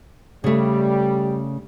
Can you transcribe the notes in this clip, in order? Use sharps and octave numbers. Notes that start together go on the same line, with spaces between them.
C#3 G3 A3